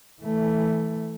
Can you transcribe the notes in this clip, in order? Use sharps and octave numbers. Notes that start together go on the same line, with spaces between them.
E3 A3